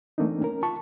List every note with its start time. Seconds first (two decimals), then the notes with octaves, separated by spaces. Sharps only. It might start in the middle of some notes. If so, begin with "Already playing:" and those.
0.18 E3 A3 A#3 C4 D4 D#4
0.41 C#4 A#4
0.63 F4 A5 C#6